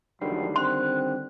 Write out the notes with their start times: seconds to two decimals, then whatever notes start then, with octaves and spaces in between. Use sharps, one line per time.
0.21 F#1 D2 D3 D#3 F3 G3 C7
0.56 C4 C6 F#6